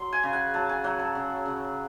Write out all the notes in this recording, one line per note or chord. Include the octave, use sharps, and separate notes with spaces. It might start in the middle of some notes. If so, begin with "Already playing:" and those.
Already playing: F#3 C6
G#5
C#3
F#5
F#3 A5
G#5
F#3 F#5
A5
C#3
C#3